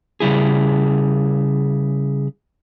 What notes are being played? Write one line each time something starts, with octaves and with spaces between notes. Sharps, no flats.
C#3 G3 E4 G#4